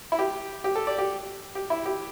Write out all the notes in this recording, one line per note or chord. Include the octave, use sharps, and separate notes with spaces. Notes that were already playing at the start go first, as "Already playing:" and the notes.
E4
G4
G4
A4
D5
G4
G4
E4
G4